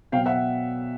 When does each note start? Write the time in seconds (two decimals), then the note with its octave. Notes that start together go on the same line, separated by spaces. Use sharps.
0.12 B2 F#3 F5 G5
0.26 E5 F#5